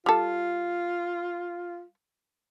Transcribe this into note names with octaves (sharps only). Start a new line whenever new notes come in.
G3 F4 A4